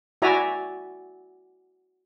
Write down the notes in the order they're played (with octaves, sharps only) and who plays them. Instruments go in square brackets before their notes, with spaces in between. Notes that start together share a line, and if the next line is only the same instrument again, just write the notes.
[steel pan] E4 F#4 D5 E5 G#5 A#5